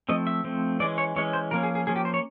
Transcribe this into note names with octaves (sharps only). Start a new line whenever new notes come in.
F3 A3 C4 D#5
E5
F3 A3 C4
E3 G#3 C#4 D5
C#5
E3 G#3 C#4 C#5
C5
F3 A#3 C#4 A#4
G#4
G#4
F3 A#3 C#4 G#4
G4
C5
C#5